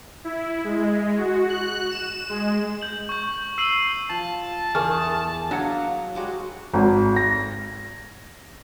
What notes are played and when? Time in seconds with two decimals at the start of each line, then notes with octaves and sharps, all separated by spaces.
0.24 E4
0.64 G#3
1.18 F#4
1.48 F#6
1.90 E7
2.29 G#3
2.81 G6 F#7
3.09 C#6 G6
3.58 E6 C7 D#7 F#7
4.10 F3 A5
4.75 E2 G#4 A#4 C#6 F6
5.51 F#3 A#3 D4 F#5
6.15 G3 G#3 F#4
6.74 G#1
7.16 A#6